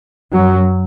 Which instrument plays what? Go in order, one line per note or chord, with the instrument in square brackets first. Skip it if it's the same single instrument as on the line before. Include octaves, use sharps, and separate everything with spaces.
[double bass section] F#2 F#3